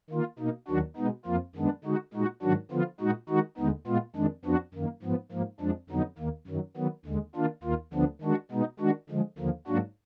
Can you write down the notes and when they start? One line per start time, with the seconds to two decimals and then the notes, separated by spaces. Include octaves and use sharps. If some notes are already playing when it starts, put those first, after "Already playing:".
0.10 D#3 A#3 F4
0.39 B2 A#3 D#4
0.68 D#2 D#3 F#3 D4 F#4
0.97 B2 G#3 B3 D#4
1.25 F2 F3 A#3 F4
1.56 F#2 D#3 G#3 B3 D4
1.84 D3 G#3 D#4 F#4
2.14 A#2 G#3 D#4 F#4
2.42 G#2 D#3 F#3 D4 F#4
2.71 D3 F3 B3 F4
3.00 A#2 G#3 D#4 F#4
3.29 D#3 G#3 D#4 F#4
3.57 D#2 D3 G#3 B3 D#4
3.87 A#2 G#3 B3 F4
4.16 F2 D#3 G#3 D4
4.45 F2 F3 B3 D4 F#4
4.74 F#2 D#3 A#3
5.02 G#2 F3 B3
5.32 G#2 F3 A#3
5.60 F2 F3 G#3 D4
5.90 F2 D3 F#3 B3 D#4
6.18 D#2 D#3 A#3
6.47 F#2 D#3 F#3
6.77 D#3 F#3 B3
7.06 D#2 D3 G#3
7.35 D#3 A#3 D4 F4
7.63 D#2 D#3 A#3 F4
7.93 D2 D3 F3 B3 D4
8.22 D#3 G#3 D4 F#4
8.51 B2 G#3 B3 D#4
8.79 D#3 G#3 D4 F#4
9.09 D3 F3 G#3
9.38 D#2 D3 F3 A#3
9.67 G#2 F#3 A#3 D4 F#4